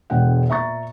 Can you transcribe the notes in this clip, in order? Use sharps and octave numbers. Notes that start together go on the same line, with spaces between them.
E1 D3 G#3 F#5 G5
A#2 E5 A#5 C#6 A6